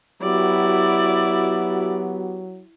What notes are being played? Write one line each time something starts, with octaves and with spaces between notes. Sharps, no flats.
F#3 B3 E4 F#4 G4 D5